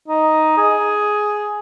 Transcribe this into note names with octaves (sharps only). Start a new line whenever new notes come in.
D#4
G#4